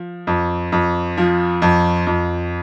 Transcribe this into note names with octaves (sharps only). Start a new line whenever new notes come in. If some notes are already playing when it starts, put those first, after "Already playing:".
Already playing: F3
F2
F2
F3
F2
F2